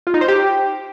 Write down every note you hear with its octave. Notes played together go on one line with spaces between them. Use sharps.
F4
D#4
C5
G4